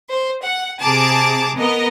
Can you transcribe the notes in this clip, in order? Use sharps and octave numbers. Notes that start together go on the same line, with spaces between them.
C5
F#5
C3 G#4 A5 A#5 D6
B3 A#4 D#5